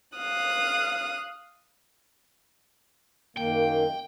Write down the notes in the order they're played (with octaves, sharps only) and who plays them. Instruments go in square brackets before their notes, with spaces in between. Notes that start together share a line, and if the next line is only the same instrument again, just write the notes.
[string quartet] F5 D#6 F#6
[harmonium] F#2 D#3 A#3 [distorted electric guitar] G5